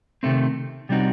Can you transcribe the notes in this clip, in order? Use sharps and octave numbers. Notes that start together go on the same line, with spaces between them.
C3 D#3 A3 C4
C3 G3 C4 D#4 F#4